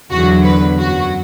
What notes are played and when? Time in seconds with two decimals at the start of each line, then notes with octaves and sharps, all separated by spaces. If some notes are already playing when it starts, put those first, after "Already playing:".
0.11 E2 D3 F#3 F#4
0.45 B4
0.78 F#2 F#3 F#4